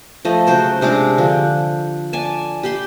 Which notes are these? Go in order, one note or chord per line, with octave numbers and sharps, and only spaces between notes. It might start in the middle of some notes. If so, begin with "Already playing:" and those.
F3 A3 D#5
C#3 F#3 C5 G5
C3 G#3 D4 D6
D3 F3
D5 G#5 A5
G4 G5 B5 C6